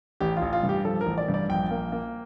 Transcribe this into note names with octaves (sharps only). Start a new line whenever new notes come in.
A1 G4
F4
A1
F4
G2
G4
F3 A4
A#4
A1
D5
G2
D5
A#1 G5
A#3
A#3